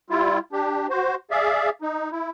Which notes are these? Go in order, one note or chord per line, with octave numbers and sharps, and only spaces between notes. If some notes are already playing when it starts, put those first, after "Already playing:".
G3 E4 F4
D4 G4
F#4 C5
G#4 D5 E5 F5
D#4
E4